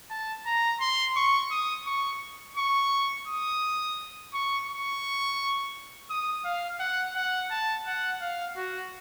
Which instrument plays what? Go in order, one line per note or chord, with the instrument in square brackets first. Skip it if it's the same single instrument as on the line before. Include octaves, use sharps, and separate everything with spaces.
[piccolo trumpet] A5
A#5
C6
C#6
D#6
C#6
C#6
D#6
C#6
C#6
D#6
F5
F#5
F#5
A5
F#5
F5
F#4